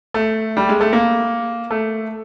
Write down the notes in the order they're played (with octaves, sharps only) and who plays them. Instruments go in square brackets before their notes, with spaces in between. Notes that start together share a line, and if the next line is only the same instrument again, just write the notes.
[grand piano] A3
G3
G#3
A3
A#3
A3